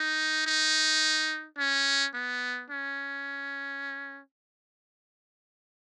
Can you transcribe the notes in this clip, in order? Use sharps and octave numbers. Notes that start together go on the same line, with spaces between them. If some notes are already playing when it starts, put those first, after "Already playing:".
Already playing: D#4
D#4
C#4
B3
C#4